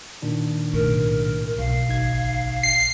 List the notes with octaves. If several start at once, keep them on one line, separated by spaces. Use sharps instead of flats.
A#2 D#3 D4
B1 A2 A#4
B1 F5
G#1 D#4 G#6
C7